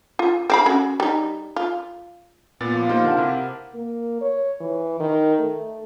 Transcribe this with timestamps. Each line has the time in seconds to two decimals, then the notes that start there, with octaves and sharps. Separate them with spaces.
0.19 F4
0.50 C4 F5 B5
0.66 C#4 F#4
1.00 G3 D#4
1.56 F4
2.61 A#2 B3 A6
2.73 F3 D6
2.89 A#3 D#4 F4 G4 C5
3.04 D3 A#4 F#5 A5
3.17 C3 E4
3.75 A#3
4.22 C#5
4.61 E3
5.00 D#3
5.39 A3